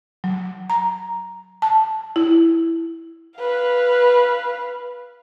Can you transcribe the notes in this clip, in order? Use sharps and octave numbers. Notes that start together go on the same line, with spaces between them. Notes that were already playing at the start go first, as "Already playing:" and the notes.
F#3
A#5
A5
E4
B4 F5